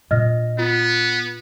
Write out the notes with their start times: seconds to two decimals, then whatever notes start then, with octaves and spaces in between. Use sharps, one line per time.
0.11 A#2 D4 D#5 F6 A#6
0.59 B3 F4